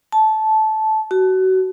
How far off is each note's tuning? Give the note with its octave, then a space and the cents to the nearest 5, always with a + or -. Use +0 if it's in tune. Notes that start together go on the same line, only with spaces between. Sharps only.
A5 -15
F#4 +25